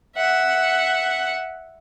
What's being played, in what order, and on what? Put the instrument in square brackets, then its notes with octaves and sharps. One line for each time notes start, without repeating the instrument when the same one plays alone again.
[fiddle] E5 F#5